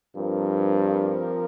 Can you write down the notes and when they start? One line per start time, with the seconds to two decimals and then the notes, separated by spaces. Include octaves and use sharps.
0.16 G2 F3 C4 F4 A#4